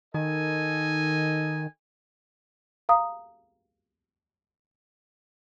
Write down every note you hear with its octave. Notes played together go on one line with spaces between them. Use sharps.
D#3 A4 D#5 G#5
F5 A#5 D#6